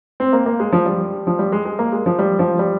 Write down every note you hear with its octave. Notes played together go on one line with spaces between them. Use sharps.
C4
A#3
A#3
G#3
F3
G3
F3
G3
G#3
G#3
A#3
G#3
F3
G3
F3
G3